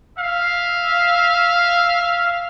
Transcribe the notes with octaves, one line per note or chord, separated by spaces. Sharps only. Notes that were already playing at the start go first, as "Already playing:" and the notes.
E5 F5